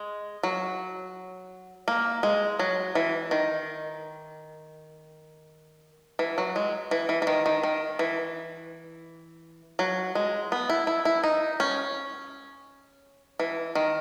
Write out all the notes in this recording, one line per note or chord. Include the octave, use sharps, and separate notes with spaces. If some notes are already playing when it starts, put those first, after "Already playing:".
Already playing: G#3
F#3
A#3
G#3
F#3
E3
D#3
E3
F#3
G#3
E3
E3
E3
D#3
D#3
D#3
E3
F#3
G#3
B3
E4
E4
E4
D#4
C#4
E3
D#3